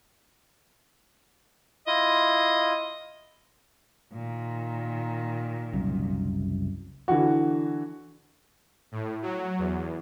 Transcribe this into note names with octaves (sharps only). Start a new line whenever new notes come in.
E4 F4 D#5
A#2 D#3
F#1 C2 F#2
D3 E3 F#4
A2
F#3
E2